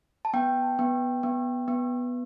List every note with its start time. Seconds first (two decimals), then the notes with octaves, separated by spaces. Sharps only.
0.25 A5
0.33 B3 G5
0.79 B3
1.23 B3
1.68 B3